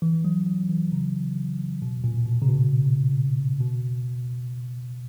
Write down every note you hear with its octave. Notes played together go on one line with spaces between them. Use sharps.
E3
F#3
F#3
E3
C#3
B2
A#2
B2
C#3
B2
B2